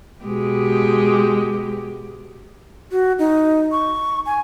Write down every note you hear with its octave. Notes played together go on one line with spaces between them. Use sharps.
B2 G#3 G4
F#4
D#4
C#6
G#5